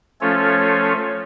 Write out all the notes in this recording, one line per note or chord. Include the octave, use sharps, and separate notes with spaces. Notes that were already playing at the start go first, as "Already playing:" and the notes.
F3 A3 C#4 F4 A4 C#5